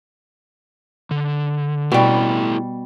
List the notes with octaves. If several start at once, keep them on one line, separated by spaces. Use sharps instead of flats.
D3
B2 G3 A3 E4 G4